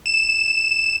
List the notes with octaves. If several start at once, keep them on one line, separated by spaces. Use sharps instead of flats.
E7